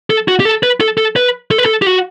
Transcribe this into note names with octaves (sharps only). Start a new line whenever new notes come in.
A4
F#4
G4
A4
B4
A4
A4
B4
A4
B4
A4
G4
F#4